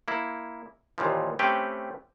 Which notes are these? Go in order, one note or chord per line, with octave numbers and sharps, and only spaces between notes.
A#3 E4
D#2 A#2 E3 F3
A3 C4 C#4 G4 B4 G5